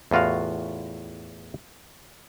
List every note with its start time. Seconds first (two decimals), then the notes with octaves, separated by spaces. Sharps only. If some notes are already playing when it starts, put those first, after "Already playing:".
0.11 E2 A2 F4 F#4 F5